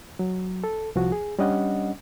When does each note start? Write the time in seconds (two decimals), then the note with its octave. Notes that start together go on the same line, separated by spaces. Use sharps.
0.19 F#3
0.64 A4
0.95 C2 F3 F#4
1.12 G#4
1.39 G3 C#4 D4 D#5 F#5